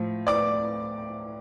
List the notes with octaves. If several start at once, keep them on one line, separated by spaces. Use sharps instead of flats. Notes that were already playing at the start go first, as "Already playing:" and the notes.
Already playing: A2 F3
D5 D6